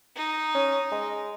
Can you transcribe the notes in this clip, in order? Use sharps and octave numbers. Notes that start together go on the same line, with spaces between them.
D#4
C#4
G#3